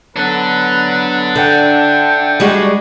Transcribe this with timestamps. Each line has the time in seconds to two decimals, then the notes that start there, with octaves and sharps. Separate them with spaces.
0.16 F#3 B3 D4 A4 B4
1.36 D3 E5 F#5 G5
2.40 G3 G#3 F#4